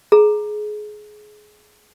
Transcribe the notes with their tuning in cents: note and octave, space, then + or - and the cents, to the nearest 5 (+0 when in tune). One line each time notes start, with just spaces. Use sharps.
G#4 +20 A#5 +0